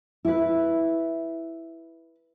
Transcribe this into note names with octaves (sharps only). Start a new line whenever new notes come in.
E4 B4